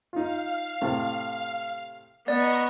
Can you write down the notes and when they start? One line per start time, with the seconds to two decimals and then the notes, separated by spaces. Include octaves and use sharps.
0.13 D#4 F4 F5
0.82 A2 C3
2.28 B3 D5 D#5 A#5 C#6